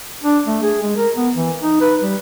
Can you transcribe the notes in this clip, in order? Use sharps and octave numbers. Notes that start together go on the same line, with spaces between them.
D4
A3
G#4
G#3
A#4
B3
E3
D#4
B4
G3